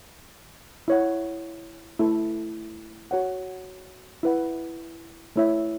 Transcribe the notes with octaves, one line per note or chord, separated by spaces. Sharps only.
E4 C#5 F#5
A3 E4 A4
F#4 C#5 F#5
E4 B4 F#5
A3 E4 C#5 E5